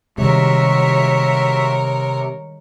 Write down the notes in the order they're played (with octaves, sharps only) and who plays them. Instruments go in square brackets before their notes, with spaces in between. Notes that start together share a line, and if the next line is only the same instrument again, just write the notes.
[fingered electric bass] C3 [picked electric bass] D#3 G3 G#3 [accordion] F#4 E5 [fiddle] A#4 C#5